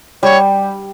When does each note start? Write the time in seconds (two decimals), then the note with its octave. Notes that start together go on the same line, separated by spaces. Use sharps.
0.22 G3 C#5